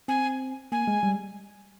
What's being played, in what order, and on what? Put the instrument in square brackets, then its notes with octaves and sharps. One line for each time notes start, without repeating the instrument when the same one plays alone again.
[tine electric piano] C4 [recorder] G#5
[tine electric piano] A#3 [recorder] G#5
[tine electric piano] G#3
G3